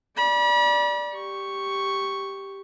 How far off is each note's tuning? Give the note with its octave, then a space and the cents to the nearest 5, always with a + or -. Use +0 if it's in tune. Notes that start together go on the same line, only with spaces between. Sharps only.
D5 +0 B5 -40
G4 +0 C#6 +0